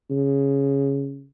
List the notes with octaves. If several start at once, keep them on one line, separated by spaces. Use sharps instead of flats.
C#3